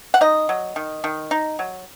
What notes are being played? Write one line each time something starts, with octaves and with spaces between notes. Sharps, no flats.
F#5
D#4 D#5
F#3
D#3
D#3
D#4
F#3